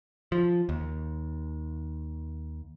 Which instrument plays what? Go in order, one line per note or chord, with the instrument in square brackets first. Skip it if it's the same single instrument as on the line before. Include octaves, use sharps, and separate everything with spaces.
[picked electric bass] F3
D#2